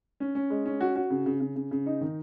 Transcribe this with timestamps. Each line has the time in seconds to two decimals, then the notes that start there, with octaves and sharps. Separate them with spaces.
0.20 C#4
0.35 C#4
0.50 G#3
0.66 C#4
0.81 F#4
0.96 F#4
1.10 C#3
1.26 C#3
1.40 C#3
1.56 C#3
1.71 C#3
1.86 D#4
2.01 D#3